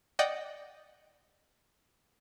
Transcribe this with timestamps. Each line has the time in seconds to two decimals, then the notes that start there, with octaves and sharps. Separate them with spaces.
0.19 D5 D#5 F#5 G5 D#6